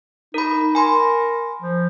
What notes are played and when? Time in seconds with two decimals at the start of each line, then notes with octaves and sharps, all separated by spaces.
0.34 D#4 A#4 B5
0.75 A#4 G#5 B5 C6
1.62 F3